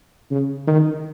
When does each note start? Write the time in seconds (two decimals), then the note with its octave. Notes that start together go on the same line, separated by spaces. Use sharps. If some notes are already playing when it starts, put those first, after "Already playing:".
0.31 C#3
0.67 D#3